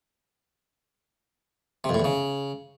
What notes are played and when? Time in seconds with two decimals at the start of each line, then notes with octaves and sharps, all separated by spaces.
1.84 C3
1.89 F2
1.94 A2
1.99 E2
2.04 C#3